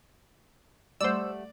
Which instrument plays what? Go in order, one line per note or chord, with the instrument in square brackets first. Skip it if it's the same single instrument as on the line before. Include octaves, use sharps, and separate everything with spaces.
[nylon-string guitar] G3 A3 F#5 [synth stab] C5 E6 [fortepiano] D5